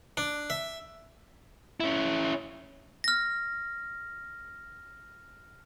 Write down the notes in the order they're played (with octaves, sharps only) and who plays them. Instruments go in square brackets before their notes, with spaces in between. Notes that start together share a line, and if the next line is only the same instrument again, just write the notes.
[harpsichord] D4
E5
[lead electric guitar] C#4 E4
[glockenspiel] F6 A#6